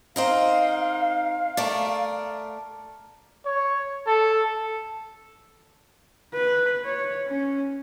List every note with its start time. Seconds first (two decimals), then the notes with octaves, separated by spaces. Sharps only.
0.16 C4 D#4 A#4 F5
1.57 A3 A#4 D5
3.46 C#5
4.07 A4
6.34 B4
6.85 C#5
7.27 C#4